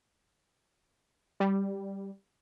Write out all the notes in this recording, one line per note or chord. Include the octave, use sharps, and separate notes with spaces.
G3